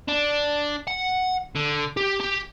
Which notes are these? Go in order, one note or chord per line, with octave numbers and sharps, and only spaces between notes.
D4
F#5
D3
G4
G4